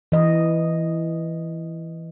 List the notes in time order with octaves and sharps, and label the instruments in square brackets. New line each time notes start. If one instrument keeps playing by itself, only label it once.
[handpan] E3 D#5